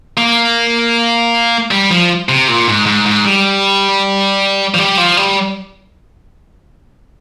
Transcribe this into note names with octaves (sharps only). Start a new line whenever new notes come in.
A#3
G3
F3
C3
A#2
G#2
G#2
G#2
G3
F3
G3
F3
G3